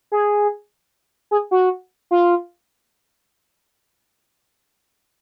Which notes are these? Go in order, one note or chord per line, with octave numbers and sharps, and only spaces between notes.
G#4
G#4
F#4
F4